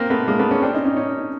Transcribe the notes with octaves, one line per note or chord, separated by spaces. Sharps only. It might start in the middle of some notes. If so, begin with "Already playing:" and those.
Already playing: A#3 C4
A3 B3
G#3 A#3
A3 B3
B3 C#4
C4 D4
C#4 D#4
C#4 D#4
C#4 D#4